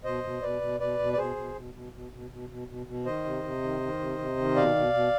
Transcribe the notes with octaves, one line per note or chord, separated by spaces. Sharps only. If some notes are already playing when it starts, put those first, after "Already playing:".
B2 C5 D#5
B2
B2 B4 D5
B2
B2 B4 D5
B2
D5
B2 G#4 C5
B2
B2
B2
B2
B2
B2
B2
B2
B2
D#3 C5 D#5
C3
C3
D#3
D#3
C3
C3
D#3
B2 D5 F5
B2
B2